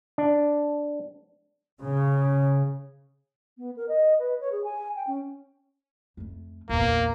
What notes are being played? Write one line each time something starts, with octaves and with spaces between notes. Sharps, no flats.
D4
C#3
B3
A#4
D#5
B4
C#5
G#4
G#5
G5
C#4
F2 A3
A#1 E2 A#3